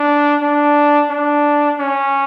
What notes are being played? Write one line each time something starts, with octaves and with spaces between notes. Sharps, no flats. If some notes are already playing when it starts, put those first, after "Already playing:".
Already playing: D4
D4
D4
C#4